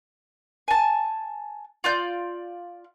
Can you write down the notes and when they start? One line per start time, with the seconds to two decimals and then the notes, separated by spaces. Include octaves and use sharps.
0.68 G#5 A5
1.84 F4 D5 G6